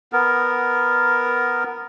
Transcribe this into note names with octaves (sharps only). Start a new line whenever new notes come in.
B3 A#4